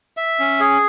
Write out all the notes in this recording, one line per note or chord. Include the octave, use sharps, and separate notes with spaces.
E5
C#4
G#4